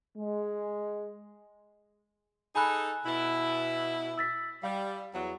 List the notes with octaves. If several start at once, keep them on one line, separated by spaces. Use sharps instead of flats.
G#3
D#4 G#4 A4 G#5 B5 F#6
B2 E4
E6 A6 B6
G3 F5
E2 F#3